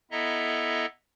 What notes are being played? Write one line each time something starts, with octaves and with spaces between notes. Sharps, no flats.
B3 E4 A4 D#5 E5 A#5